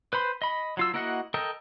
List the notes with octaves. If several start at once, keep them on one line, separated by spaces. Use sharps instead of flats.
B4 C5 B5 C6
D#5 B5
F#3 F4 E6
A#3 E4 F#4 D#5 F#5
A4 A#4 D#5 G5